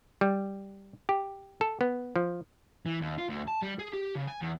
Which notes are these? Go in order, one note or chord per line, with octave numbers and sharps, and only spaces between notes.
G3
G4
A4
B3
F3
E3
D#2
F4
D2
A5
G3
G#4
G4
C#3
G#5
E2